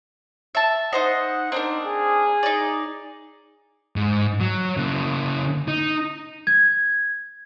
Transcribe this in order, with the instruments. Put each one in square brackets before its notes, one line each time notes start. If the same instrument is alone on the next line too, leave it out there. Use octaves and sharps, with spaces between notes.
[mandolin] E5 A5
[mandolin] D#4 C5 D#5 [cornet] F#5
[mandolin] C4 D4 A#4 [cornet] D#4
[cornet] G#4
[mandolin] D#4 D5
[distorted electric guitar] G#2
F#3
C#3 A#3
D#4
[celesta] G#6